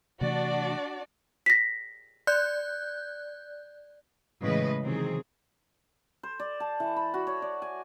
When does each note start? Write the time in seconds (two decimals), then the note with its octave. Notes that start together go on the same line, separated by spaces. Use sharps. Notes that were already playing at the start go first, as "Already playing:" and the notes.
0.21 C3 E3 A3 D4 F#4 D5
1.46 A#6 B6
2.27 D5 F#6 G6
4.43 A2 C#3 E3 G#3 B4 D#5
4.83 C3 D#3 E3 F#3 C4 G#4
6.23 C5
6.40 D5
6.60 A5
6.80 E3
6.96 B5
7.14 F#4
7.27 C#5
7.42 D5
7.62 G#5